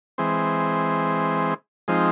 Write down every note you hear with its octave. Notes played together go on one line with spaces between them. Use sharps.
E3 G#3 C4
F3 G#3 C4 D#4